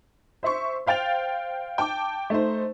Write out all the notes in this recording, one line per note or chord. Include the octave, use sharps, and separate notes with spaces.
C5 E5 C6 C#6
C5 F5 G5 A6 F7
G5 A5 D6
A3 D#4 C5